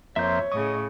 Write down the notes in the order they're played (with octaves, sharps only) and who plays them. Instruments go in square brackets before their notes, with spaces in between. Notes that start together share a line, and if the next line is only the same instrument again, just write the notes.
[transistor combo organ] F2 A#3 C4 [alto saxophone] C#5 [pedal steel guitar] E5 G6
[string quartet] A2 C#3 [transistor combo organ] D#5 [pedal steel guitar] C#6